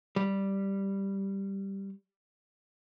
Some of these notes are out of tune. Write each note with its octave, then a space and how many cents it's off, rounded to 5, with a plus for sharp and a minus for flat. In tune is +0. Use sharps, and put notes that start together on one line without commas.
G3 +0